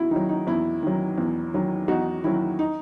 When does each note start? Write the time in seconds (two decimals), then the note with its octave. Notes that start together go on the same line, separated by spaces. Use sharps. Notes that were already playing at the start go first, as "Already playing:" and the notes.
Already playing: E2 E4 F#4
0.11 D#3 F#3 D#4
0.29 D#4
0.47 E2 E4
0.83 D#3 F#3
1.18 E2
1.54 D#3 F#3
1.88 E2 D#4 F#4
2.24 D#3 F#3 E4
2.59 D#4